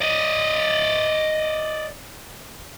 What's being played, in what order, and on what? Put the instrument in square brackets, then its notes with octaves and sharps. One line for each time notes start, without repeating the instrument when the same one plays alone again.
[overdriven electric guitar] D5 D#5